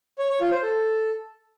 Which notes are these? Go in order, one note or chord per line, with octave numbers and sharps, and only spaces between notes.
C#5
C#5
F4
C5
A4